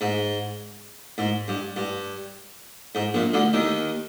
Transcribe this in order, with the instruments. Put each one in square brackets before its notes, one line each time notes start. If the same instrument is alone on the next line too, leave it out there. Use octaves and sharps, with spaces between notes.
[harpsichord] G#2
G#2
G2
G2
G#2
A#1 A#2
D2 D3
D#2 D#3